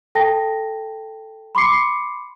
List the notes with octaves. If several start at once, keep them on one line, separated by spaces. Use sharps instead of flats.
A4 G5 A5 A#6
B5 C6 D6 C7 C#7